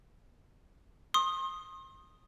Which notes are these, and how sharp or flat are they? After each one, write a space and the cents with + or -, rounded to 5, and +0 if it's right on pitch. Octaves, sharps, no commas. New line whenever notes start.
C6 +35 D#6 +0